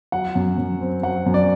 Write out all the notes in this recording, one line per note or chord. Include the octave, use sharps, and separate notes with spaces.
F#3 F#5
F#2
F#2
C4
F#3 F#5
F#2
D5